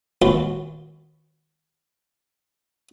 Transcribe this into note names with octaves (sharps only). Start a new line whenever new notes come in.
A#1 D#2 F4 F#4 C6